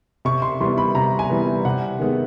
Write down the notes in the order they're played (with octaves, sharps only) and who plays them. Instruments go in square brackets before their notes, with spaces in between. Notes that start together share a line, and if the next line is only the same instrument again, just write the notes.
[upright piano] C3 C#6
C6
E3 G3 B3 C6
B5
C3 A#5
G#5
E3 G3 B3
C3 F#5
D#3 G#3 B3